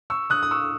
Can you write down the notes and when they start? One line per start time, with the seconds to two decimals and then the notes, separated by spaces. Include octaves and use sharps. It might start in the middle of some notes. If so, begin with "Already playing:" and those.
0.10 C#6 E6
0.30 D#6 F#6
0.43 D#6
0.51 C#6 E6